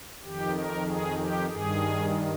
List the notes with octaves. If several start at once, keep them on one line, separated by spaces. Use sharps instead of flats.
F2 D#3 G4
A#4
G#4
G4
G2 D#3 G#4